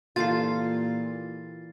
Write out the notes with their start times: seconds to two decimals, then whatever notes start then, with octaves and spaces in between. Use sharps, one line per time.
0.16 A#2 E3 F4 G4 A4 A6 C7